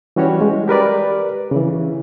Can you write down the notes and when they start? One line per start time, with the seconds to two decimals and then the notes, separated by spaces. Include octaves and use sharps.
0.16 E3 G3 C#4 F#4 G4 C#5
0.41 G#3
0.68 G4 A#4 B4 D5
1.51 C#3 E3